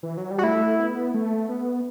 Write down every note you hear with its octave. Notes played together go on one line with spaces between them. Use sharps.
E3
F#3
G3
F#4
A3 E4
B3
A3
B3